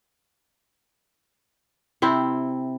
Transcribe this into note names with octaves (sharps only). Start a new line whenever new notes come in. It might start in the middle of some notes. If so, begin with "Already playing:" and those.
C3 C4 E4